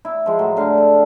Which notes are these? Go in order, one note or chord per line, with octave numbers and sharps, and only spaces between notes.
E4
F3 G#3
A2 F#3
D3 F5 G5
A4